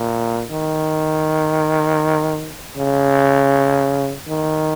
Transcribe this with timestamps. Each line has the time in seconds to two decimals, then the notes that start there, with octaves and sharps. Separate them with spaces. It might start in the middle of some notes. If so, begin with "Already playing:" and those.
Already playing: A#2
0.50 D#3
2.77 C#3
4.28 D#3